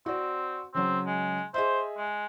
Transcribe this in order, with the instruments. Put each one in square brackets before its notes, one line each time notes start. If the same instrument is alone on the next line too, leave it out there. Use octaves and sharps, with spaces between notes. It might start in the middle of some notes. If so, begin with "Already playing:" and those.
[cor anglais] C4 [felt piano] F#4 D5
[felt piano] C#3 F#3 [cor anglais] C4
[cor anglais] G#3
[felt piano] G#4 D#5 E5 [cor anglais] C5
[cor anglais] G#3